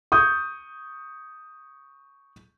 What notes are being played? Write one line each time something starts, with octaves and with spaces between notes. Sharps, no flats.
C#6 D#6 G6